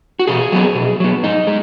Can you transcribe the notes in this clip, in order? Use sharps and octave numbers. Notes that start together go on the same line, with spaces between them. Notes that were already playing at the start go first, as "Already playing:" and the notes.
F#4
B2 G#4
F#3 B3
B2
F#3 B3
G#2 D#4
G#3